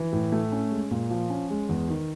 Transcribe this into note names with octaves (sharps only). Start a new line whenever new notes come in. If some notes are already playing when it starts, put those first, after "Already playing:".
Already playing: E3
A2
A3
C#4
G#3
A#2
F3
C#4
G#3
E2
D#3